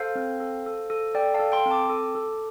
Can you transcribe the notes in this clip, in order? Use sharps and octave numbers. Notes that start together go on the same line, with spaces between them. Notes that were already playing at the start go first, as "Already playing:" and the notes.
Already playing: A4 C5 F5
C4
A4
A4
A4
A4 D5 G5
F5 A5
A4
G5 C6
C4
A5 D6
A4
A4